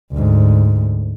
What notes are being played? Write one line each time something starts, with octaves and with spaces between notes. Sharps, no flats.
D2 G#2